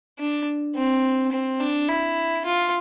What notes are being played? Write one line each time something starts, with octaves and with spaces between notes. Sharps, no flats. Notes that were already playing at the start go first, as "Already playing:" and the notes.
D4
C4
C4
D4
E4
F4